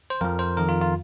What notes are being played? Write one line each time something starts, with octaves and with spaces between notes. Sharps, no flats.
C5
F2 F3 A#4
C5
F2 D#3 A#4
F4
F4